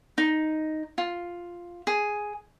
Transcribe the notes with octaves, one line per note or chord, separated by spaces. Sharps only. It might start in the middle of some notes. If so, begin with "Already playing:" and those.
D#4
F4
G#4